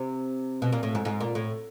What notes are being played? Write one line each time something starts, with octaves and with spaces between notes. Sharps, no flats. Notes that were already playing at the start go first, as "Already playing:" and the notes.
Already playing: C3
B2
A#2
A2
G#2
G#2
A#2
A2